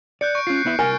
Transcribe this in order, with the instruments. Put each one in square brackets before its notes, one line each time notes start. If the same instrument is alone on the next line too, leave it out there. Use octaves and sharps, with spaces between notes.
[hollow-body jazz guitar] D5 [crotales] F#6 G6 C#7
[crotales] C#6 D7
[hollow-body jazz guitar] C#4 F4 [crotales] C7
[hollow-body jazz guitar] B3 E4 E5
[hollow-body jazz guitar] C2 A#4 [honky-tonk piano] G#5 [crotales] F6 A6